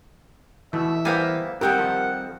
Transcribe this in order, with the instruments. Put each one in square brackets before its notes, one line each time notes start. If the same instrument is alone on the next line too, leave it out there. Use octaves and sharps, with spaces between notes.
[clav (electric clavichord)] B2 A3 [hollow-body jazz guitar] E3 [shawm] E5
[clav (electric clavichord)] G3 A#3 B3 [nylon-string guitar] C5 F5 G#5
[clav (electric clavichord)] D#3 [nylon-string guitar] G3 C4 A4 [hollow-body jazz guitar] G4 A#4 [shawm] F#5
[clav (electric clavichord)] D#3 F3